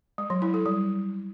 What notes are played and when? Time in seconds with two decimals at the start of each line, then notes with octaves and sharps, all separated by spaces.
0.18 G#3
0.30 F#3
0.42 E4
0.54 A4
0.66 G3